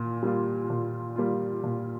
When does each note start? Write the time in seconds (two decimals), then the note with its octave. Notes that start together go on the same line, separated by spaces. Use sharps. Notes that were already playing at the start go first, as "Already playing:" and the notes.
Already playing: A#2
0.23 G3 A#3 F4
0.70 A#2
1.16 G3 A#3 F4
1.64 A#2